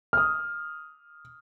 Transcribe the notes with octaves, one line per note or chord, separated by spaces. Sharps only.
D#6 F6